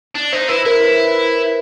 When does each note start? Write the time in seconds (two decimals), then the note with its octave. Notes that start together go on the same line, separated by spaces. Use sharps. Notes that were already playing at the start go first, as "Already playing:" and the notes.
0.15 D4
0.32 D#4 C5
0.49 E4 B4
0.66 E4 A#4
0.83 B4